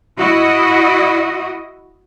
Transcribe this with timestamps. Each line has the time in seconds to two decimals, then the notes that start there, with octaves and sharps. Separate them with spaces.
0.17 E4 F#4 D#5